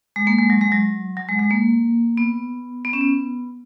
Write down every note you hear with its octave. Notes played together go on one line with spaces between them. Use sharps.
G#3
A#3
G#3
F#3
G#3
F#3
F#3
G#3
G#3
A#3
B3
B3
C#4
B3